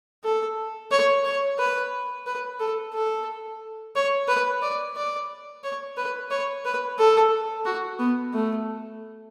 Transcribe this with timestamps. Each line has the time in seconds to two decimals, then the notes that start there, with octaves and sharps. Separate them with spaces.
0.24 A4
0.91 C#5
1.25 C#5
1.58 B4
2.26 B4
2.59 A4
2.94 A4
3.95 C#5
4.28 B4
4.62 D5
4.96 D5
5.63 C#5
5.97 B4
6.31 C#5
6.65 B4
6.98 A4
7.65 F#4
7.99 B3
8.33 A3